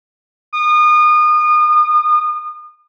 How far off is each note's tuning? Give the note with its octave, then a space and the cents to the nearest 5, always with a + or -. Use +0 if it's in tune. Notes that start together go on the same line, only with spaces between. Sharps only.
D#6 -35